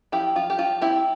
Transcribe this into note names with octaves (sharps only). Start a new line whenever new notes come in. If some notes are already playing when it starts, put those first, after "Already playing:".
F3 E4 G4
F3 F4
G4
F3 F4
C4 E4 G4